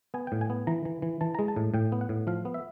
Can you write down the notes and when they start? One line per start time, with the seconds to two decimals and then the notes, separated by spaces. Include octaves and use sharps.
0.14 B3 G#5
0.27 A2 G5
0.41 G#5
0.50 B3
0.67 E3 A#5
0.85 E3
1.02 E3
1.21 E3 A5
1.35 G#3 A#5
1.48 A5
1.56 A2
1.74 A2 G5
1.92 B3
2.01 F#5
2.09 A2
2.27 F3 F5
2.45 B3
2.54 E5